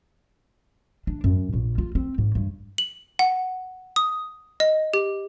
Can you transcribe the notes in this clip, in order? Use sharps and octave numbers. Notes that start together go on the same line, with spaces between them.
D4
F#2
A#1
F4
C4
G#2
G2
F#7
F#5
D#6
D#5
G4